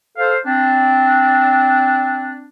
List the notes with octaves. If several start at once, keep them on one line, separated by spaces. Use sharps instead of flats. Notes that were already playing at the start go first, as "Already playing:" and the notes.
A4 C5 F5
C4 D4